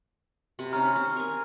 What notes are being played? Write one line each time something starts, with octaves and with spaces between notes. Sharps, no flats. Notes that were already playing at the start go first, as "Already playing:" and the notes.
C3 B5
C4 C#4 D#4 A#5 F6
C4
A#4 G#5